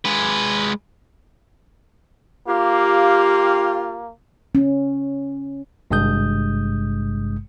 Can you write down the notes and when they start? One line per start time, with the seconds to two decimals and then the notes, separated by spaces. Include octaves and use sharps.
0.05 G#3 B4
2.48 A#3 F4 G4
4.55 C#4
5.91 G#1 G2 C3 G#3 D#6 G6